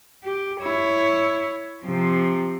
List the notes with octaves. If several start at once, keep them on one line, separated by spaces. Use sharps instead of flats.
G4
E4 C#5
C3 F3